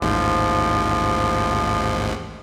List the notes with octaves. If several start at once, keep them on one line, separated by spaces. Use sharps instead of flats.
A1 D#2 G#2 F3